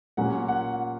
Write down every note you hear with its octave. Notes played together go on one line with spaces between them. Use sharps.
A#2 F#3 A#3 C#4 F#5
F#5